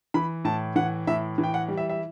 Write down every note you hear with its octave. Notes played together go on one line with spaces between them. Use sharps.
E3 B5
A2 A5
E3 F#5
A2 E5
E3
G5
F#5
G3
E5
E5